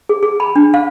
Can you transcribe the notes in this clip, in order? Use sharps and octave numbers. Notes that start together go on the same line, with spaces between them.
G#4
G#4
B5
D4
F5